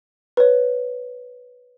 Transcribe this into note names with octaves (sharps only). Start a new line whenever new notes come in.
B4 C#5